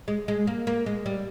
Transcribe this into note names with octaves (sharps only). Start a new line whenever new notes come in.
G#3
G#3
A#3
A#3
G#3
G3